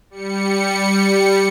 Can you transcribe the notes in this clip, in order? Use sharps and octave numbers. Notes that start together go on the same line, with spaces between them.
G3 C#7